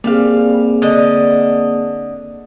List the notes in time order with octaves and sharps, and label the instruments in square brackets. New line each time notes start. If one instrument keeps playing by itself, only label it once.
[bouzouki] G3 F5 [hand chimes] A#3 C4 G#4
[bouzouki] D3 D#5